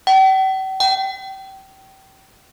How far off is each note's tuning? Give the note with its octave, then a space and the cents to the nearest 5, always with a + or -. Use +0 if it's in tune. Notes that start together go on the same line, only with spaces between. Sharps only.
G5 -45
G5 -25